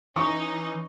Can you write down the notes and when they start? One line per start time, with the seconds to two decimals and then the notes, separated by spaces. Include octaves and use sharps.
0.16 E3 C#4 D#4 C#6